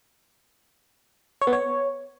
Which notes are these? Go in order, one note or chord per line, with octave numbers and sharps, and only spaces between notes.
C#5
B3
C#5